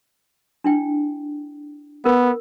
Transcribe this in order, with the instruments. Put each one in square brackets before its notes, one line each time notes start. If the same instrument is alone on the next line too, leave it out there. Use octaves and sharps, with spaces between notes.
[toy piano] D4 E4 G5
[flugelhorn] B3 [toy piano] A#4